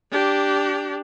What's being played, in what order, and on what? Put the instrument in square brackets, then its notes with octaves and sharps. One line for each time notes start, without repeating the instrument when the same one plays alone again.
[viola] D4 G4